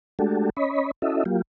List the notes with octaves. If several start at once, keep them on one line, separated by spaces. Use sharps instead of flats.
G#3 A3 D4 F#4 G4 A4
C#4 C#5 D#5 B5
C#4 E4 F#4 A4 D#5 E5
F#3 A#3 F4 G4